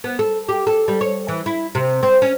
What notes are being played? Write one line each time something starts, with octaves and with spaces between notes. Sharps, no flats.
B3
A4
G4
A4
G3
C#5
E3
E4
C3
C4
C#4